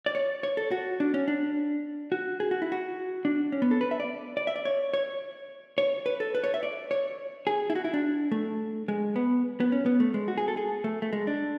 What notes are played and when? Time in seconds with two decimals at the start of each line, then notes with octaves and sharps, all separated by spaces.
0.06 D5
0.15 C#5
0.43 C#5
0.57 A4
0.71 F#4
1.00 D4
1.14 C#4
1.28 D4
2.12 F#4
2.40 G#4
2.51 F#4
2.62 E4
2.72 F#4
3.25 D4
3.52 C#4
3.62 B3
3.71 A4
3.81 B4
3.91 E5
4.00 D5
4.37 D5
4.47 E5
4.56 D5
4.65 C#5
4.94 C#5
5.78 C#5
6.06 B4
6.20 A4
6.35 B4
6.44 C#5
6.54 E5
6.63 D5
6.91 C#5
7.47 G#4
7.70 E4
7.75 F#4
7.84 E4
7.94 D4
8.32 A3
8.88 G#3
9.16 B3
9.60 B3
9.72 C#4
9.86 B3
10.00 A3
10.14 G#3
10.28 F#4
10.38 G#4
10.48 A4
10.57 G#4
10.84 A3
11.02 A3
11.13 G#3
11.27 D4